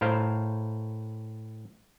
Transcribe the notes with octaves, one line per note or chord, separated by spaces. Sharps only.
A2 A#4 C5 F5